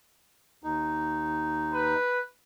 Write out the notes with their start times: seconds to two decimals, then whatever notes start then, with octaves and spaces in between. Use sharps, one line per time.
0.64 D#2 D#4
1.73 B4